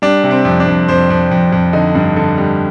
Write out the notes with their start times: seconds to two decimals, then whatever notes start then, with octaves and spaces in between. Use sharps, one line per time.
0.02 G3 D4
0.24 C3
0.31 C4
0.45 F2
0.60 D4
0.67 F2
0.88 F2 C5
1.10 F2
1.31 F2
1.52 F2
1.73 D3 D#4
1.95 G2
2.16 D3
2.37 G3